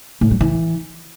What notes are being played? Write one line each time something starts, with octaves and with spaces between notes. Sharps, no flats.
A2
F#3
E3